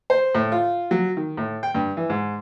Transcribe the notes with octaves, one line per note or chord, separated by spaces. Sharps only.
C5
A2
F4
F#3
D#3
A2
G5
G2
E3
G#2